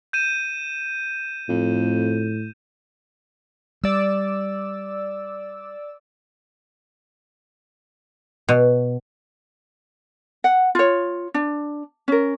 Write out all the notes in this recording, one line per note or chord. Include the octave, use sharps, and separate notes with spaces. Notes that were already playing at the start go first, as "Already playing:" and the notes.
G6 D#7 E7
F2 A2
G3 D5 E6
B2
F#5
F4 C#5
D4
C#4 A#4